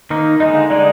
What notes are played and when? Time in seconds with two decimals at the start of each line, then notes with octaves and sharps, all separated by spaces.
0.10 D#3 A#3 D#4
0.40 D3 G#3 D#4 D#5
0.55 F5
0.70 D3 G#3 D#4 D5